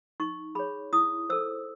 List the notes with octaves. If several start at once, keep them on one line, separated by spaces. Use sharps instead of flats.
D#4 C#6
G#4 C#5 B5
E4 D#6
A4 C5 E6